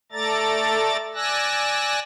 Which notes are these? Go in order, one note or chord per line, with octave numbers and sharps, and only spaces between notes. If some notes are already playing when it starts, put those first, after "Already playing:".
A3 A4 D5 A#5 A6
D5 G#5 E6 F#6 A#6